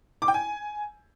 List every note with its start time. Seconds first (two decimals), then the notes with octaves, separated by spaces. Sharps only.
0.22 D6
0.28 G5
0.34 G#5